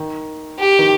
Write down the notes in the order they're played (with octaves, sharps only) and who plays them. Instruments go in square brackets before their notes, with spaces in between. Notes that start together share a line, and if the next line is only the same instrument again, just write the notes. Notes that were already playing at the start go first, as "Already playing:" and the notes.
Already playing: [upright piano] D#3
[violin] G4
[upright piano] D#3